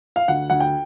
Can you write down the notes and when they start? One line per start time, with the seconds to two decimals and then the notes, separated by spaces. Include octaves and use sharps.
0.16 F5
0.28 D2 F#5
0.50 D2 F#5
0.60 G5